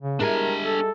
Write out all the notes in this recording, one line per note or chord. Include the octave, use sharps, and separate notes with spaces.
C#3
G3 G#3 D4 E4 A#4 G#5
A4